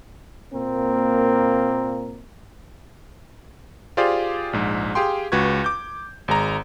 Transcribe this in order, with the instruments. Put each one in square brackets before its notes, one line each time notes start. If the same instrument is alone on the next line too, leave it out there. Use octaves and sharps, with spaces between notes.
[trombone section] A#2 A#3 C4 A#4
[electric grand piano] F4 G4 G#4 C5 D5 F5
A#1 G#2
G4 G#4 F5 G5 C6
C#2 F#4 B4 C#6 G#6
D6 G6
G#1 G#3 A#5